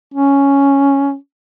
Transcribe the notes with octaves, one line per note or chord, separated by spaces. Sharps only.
C#4